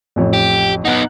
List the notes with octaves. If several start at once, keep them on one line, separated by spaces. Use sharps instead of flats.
A1 F2 C#5
G4
B3 D#4 F#5 F#6